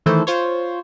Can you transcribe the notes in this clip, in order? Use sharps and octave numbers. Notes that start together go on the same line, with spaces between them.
D#3 E3 A3 A4 C5
F4 C5 C#5